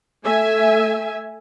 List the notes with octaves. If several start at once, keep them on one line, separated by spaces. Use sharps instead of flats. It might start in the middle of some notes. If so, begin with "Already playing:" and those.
A3 E5 G#5